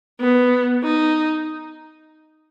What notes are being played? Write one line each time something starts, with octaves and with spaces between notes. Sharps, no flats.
B3
D#4